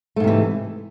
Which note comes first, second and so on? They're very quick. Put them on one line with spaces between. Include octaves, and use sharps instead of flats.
A3 G#2 C3 E3